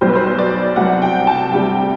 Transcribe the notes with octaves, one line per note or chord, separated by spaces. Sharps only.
B1 B2 G3 C5
B4
C5
D5
C2 C3 F#3 F#5
G5
A5
D2 C3 G3 G5